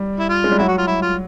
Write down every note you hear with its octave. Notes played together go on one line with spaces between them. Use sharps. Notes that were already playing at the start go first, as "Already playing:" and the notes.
Already playing: G3
E4
F4
G#3
G3
F#3 E4
F#4
F4
E4
F4